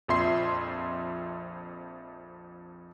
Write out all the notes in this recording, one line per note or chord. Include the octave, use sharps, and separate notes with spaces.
A#1 F2 F3 E5 C6 C7